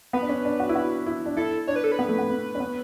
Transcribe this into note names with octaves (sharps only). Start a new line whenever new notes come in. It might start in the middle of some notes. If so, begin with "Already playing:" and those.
B3 B4
D4
C#4
D4
F#4
E4
F#4
E4
D4
E4 A4
D4 C#5
B4
A4
B4
B3
A3
B3
B3
C#4
B3